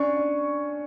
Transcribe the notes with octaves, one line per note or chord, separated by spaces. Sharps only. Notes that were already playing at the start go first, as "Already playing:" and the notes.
Already playing: C#4 D4 C#6
D4